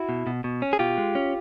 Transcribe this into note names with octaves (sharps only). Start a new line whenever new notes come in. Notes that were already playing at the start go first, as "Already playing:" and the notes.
Already playing: E4 F#4
B2
B2
B2
C#4
G#4
B2 F4 G4
G#3
C#4